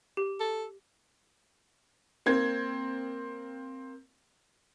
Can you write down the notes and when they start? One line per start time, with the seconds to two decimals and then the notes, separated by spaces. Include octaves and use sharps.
0.17 G4
0.40 A4
2.26 A#3 C4 G#6